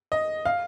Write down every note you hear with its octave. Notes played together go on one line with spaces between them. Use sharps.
D#5
F5